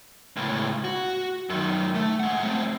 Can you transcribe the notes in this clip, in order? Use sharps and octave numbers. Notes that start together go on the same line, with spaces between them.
C#2 A2
F#4
F#2 D#3
A3
G#3 F#5
A3 C4